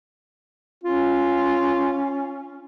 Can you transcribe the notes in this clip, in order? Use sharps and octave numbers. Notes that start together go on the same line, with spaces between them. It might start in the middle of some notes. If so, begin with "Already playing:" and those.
C#4 F4